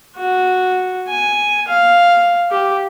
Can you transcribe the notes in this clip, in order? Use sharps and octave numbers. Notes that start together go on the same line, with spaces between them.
F#4
G#5
F5
G4